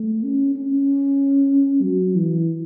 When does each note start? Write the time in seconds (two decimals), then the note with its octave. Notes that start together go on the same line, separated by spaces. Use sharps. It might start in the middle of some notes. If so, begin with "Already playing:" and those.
Already playing: A3
0.23 C#4
0.55 C#4
1.83 F#3
2.15 E3